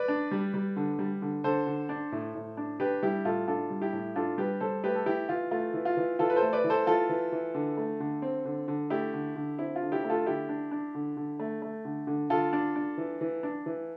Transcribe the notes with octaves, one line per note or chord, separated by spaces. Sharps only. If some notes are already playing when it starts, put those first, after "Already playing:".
Already playing: B4 D5
D4
G3
G3
D3
G3
D3
D3 A4 C5
D3
D4
A2
A2
D4
D4 G4 B4
G3 E4 G4
A2 F4 A4
D4 F4 A4
G3
E4 G4
A2
D4 F4 A4
G3 G4 B4
G3 A4 C5
A3 G4 B4
A4
E3 E4 G4
E3 F4
A3 F4
E3
F4
E3
E3 F4 A4
B4
A4 C5
A3
B4 D5
E3
A4 C5
E3 F4 A4
E3
E3
D3
A3
D3
C4
D3
D3
A3 E4 G4
D3
D3
C4 E4
F4
D3
E4 G4
A3
F4 A4
D3 E4 G4
D4
D4
D3
D3
A3
A3
D3
D3
D3 F4 A4
D4
D4
E3
E3
D4
E3